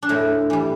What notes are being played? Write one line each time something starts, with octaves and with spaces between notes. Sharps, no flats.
D4
A2 E4
E3 G3